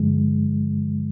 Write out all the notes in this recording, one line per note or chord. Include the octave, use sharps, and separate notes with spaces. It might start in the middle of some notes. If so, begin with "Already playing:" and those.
Already playing: G2 D3 F3 G#3